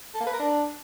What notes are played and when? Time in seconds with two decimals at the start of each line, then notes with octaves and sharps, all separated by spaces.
0.14 A4
0.21 A#3
0.27 B4
0.33 A#4
0.39 D4